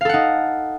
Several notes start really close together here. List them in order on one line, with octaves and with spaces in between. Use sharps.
F5 A4 F#5 D#4